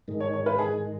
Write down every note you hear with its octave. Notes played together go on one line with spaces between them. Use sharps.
G#2 D#3 G#3
C#5
C#5
B4
G#4